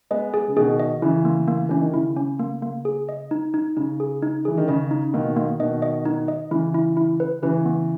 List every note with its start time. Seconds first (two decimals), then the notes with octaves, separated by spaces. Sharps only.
0.11 G#3 B3 D#5
0.34 G#4
0.48 C#3
0.56 B2 D#3 G#4
0.79 D#5
1.02 C#3 E3 E4
1.25 A#3
1.48 A#3
1.69 E3 C#4
1.81 D#3
1.94 C#3 E4
2.16 C#4
2.39 A#3
2.62 A#3
2.85 G#4
3.09 D#5
3.31 D#4
3.54 D#4
3.77 C#3 D#4
4.00 G#4
4.22 D#4
4.45 E3 G#4
4.57 D#3
4.68 C#3 D#5
4.91 D#4
5.14 B2 D#3 A#3
5.37 A#3
5.60 B2 D#3 D#5
5.82 D#5
6.05 D#4
6.28 D#5
6.51 C#3 E3 E4
6.74 E4
6.97 E4
7.20 B4
7.42 C#3 E3 B4
7.66 B3